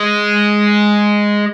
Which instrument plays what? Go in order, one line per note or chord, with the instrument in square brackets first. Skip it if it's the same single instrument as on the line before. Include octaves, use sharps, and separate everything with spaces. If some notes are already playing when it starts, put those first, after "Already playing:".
Already playing: [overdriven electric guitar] G#3